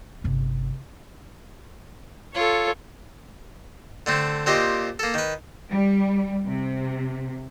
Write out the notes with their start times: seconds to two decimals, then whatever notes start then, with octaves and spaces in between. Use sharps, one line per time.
0.24 G1 C3
2.34 F4 A4 C#5
4.06 D3 A3 C4
4.46 A#2 C4 G4 D#5
4.99 A#3 A4
5.14 D#3 B4
5.70 G3
6.46 C3